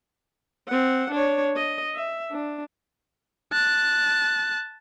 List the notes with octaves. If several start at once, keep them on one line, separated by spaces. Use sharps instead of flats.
C4 F#5
D4 C#5
D#5
E5
D4
A5 F#6